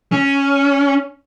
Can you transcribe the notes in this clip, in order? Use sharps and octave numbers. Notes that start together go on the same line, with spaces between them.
C#4